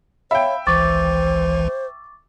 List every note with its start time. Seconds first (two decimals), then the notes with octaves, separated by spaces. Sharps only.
0.31 C#5 E5 F5 G5 B5
0.67 G#1 C#2 E3 C5 C#6 D6 A6